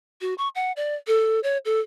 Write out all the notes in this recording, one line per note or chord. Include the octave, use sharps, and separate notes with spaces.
F#4
C#6
F#5
D5
A4
C#5
A4